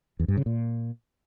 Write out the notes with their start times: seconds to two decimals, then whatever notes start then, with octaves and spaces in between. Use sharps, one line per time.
0.19 E2
0.28 G2
0.37 C#3
0.46 A#2